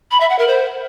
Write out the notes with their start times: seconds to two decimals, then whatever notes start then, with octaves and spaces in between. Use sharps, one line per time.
0.11 B5
0.20 E5
0.29 F#5
0.38 A#4
0.48 C5